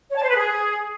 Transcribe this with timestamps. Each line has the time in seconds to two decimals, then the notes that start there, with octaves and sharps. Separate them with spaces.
0.10 C#5
0.16 A5
0.22 C5
0.28 B4
0.35 G#4